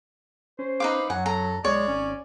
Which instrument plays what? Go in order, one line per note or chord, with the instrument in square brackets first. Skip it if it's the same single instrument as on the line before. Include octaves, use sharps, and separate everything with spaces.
[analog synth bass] C#4 [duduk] C5
[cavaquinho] D#4 B4 D6 [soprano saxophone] F5
[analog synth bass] F#2 [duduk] F#3 [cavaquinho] F#5 [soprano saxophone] G#5
[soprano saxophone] A4 [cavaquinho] A#5
[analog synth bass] B1 [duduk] G#3 [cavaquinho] C#5 [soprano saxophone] D5
[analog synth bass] G#1 [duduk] C#4